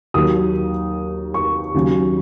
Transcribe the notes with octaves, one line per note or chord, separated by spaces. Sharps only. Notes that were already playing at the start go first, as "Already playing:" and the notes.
D#2 D#3 F#3 D#6
C#6
D#2 C#3 F#3